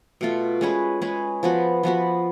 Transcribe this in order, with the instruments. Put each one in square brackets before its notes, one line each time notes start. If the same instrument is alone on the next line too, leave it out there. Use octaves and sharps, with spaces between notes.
[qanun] B2 A3 F4
G#3 C#4 G#4 B4
G#3 C#4 G#4 B4
F3 B3 F#4 B4
F3 B3 F#4 B4